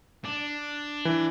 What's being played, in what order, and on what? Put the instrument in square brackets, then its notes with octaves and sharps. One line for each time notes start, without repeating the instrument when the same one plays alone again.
[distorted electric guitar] D4
[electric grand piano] E3